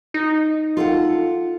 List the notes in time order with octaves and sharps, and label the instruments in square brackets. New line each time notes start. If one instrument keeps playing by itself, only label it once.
[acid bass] D#4
[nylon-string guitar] F4 A4 F#5